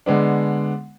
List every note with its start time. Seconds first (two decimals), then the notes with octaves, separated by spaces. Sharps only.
0.06 D3 G#3 B3 D4